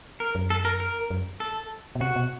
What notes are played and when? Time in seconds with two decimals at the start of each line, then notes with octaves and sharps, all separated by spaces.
0.20 A#4
0.35 F#2
0.50 A4
0.65 A#4
0.80 A#4
1.11 F#2
1.40 A4
1.95 B2
2.01 C3 F#4
2.16 B2